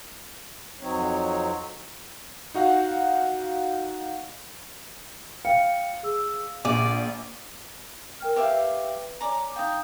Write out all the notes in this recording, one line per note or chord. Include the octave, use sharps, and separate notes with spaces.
F2 F#3 C4 D#4 C#5
D#4 F#4 F5 F#5
F5 G5 C#7
G#4 E6
A#1 D5 D#7
A#4 G5 F6
G4 B4 E5 F5 G5
C#5 D5 G#5 A#5 D6
D#4 F5 G5 D#6